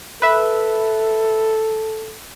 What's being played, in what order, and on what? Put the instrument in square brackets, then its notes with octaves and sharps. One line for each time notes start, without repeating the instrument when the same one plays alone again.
[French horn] A4 [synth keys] B4 E5